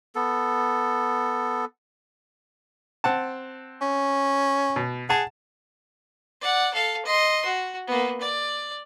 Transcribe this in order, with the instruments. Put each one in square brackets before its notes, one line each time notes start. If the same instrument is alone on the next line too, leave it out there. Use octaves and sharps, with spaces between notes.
[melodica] B3 A4
[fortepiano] C4 F#5 A5
[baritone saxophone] C#4
[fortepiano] B2
[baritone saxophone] G#4 [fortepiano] F#5 A5
[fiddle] D5 F#5
A4 F5
D#5 C6
F#4
A#3 B3
D5